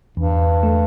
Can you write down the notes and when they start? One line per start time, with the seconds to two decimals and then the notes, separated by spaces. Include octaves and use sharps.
0.17 E2 G2
0.63 A3